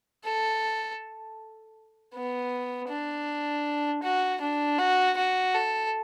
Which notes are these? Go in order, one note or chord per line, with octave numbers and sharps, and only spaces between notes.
A4
B3
D4
F#4
D4
F#4
F#4
A4